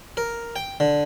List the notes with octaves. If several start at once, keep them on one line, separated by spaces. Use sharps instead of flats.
A#4
G5
D3